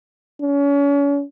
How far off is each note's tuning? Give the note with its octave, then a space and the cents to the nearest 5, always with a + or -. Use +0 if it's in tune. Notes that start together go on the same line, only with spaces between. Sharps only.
C#4 +35